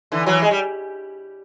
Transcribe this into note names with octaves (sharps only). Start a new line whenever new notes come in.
D3 E3
E3 F#3
G#3
G3